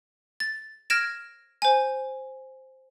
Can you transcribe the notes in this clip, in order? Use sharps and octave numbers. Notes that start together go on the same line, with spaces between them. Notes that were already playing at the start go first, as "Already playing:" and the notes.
A6
F6 G#6 A#6 D7 E7
C5 G#5